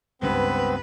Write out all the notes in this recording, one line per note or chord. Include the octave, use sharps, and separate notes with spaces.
C#2 G2 B3 C4 B4